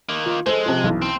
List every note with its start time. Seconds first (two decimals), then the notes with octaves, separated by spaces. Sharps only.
0.09 D#3 A#3
0.26 F4
0.46 G#3 A4 C5
0.66 C3 F3
0.84 B1 E3
1.02 C4